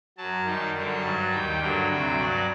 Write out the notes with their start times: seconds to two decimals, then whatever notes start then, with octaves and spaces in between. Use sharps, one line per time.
0.17 F#2 F#3 A5
0.45 F#2 D#3 G3
0.74 F#2 D3 G3 A5
1.03 G2 F#3
1.31 D#2 D#3 G3 G5
1.60 G2 D3 F#3
1.89 D2 C3 F#3
2.17 G2 F#3 D5